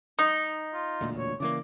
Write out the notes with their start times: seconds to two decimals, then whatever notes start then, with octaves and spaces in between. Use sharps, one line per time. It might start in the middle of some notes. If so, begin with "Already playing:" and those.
0.19 D#4 D#6
0.74 F4
1.01 E1 D2 A#2
1.18 C#5
1.40 C#3 E3 A#3 D5